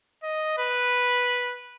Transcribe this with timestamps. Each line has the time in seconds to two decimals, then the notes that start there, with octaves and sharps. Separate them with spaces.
0.23 D#5
0.58 B4